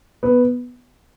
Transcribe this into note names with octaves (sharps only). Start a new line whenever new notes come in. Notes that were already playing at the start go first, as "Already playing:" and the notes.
B3